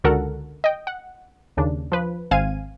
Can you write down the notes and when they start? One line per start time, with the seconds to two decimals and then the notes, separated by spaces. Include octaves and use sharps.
0.04 C#2 D3 F#4 A4 A#4 F#5
0.64 D#5 G5
0.87 F#5
1.57 D#2 C#3 D4
1.92 F3 B4
2.31 G#1 C4 F5 G#5 G#6 D#7